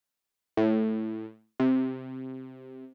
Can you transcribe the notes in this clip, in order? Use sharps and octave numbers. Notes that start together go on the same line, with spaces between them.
A2
C3